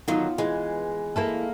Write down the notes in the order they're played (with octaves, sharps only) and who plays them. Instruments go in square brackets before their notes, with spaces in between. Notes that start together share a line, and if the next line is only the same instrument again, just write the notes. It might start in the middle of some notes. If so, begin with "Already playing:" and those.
[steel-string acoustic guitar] D3 D#3 F#3 [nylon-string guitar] B3 F4
[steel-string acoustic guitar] E3 [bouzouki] G#3
[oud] A#3 E4 A4